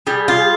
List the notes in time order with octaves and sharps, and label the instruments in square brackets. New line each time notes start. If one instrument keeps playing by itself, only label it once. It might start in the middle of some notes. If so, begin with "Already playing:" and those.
[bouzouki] G3 [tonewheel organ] G#4
[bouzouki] F4